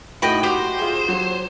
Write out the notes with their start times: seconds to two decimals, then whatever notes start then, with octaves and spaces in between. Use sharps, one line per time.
0.22 A2 D#4 F#4 D#5 G5 B5
0.44 F#4 G4 C5
0.78 F4 G#4
1.08 F#3